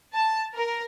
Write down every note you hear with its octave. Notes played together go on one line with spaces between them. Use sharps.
A5
A#4